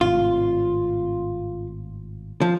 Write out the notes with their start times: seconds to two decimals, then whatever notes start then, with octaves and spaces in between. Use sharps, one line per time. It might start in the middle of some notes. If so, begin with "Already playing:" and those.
0.01 G#1 A2 C3 F4
2.41 F3